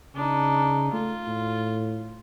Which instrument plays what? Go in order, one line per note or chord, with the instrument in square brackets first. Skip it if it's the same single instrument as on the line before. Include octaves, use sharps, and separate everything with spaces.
[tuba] C#3 [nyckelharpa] D4 D#4
[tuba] A3 [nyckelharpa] F4
[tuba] A2